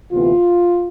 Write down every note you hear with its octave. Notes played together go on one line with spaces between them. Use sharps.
D2 C3 E3 B3 F4